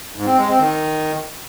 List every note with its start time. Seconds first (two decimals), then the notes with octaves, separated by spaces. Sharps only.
0.16 G#2
0.27 C4
0.38 G#3
0.49 C4
0.60 D#3